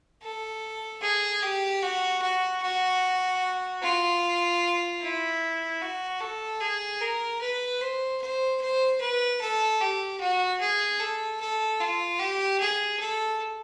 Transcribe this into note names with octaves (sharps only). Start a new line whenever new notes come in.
A4
G#4
G4
F#4
F#4
F#4
F4
E4
F#4
A4
G#4
A#4
B4
C5
C5
C5
B4
A4
G4
F#4
G#4
A4
A4
F4
G4
G#4
A4